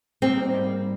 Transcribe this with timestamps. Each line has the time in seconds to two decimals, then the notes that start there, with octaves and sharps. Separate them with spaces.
0.22 G3 A#3 C4 D#4 A#4
0.52 G#2 G3 A#3